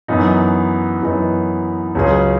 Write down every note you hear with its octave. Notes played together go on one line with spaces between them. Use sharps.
F#2 E3 B3 D#4
F#2 E3 B3 D#4
C#2 C#3 F#3 C#4 G#4